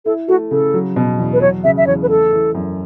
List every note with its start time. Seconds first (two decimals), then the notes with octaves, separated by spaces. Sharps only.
0.05 E4 A4
0.28 A3 F#4
0.51 C#3 A4
0.74 F#3
0.96 B2
1.19 E2
1.33 B4
1.41 F#3 C#5
1.64 C#3 E5
1.77 E5
1.87 E2 C#5
2.02 B4
2.09 A3 A4
2.32 E3
2.55 F#2